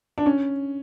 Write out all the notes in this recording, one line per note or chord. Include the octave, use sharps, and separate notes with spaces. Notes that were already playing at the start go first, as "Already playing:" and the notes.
D4
C#4